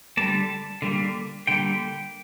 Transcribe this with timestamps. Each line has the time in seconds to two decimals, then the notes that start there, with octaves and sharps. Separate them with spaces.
0.17 D3 G3 A#3 A5
0.82 D3 G3 A#3
1.47 D3 G3 A#3 G5